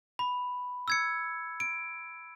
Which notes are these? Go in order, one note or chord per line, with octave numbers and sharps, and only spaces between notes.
B5
E6 G#6 C#7
D7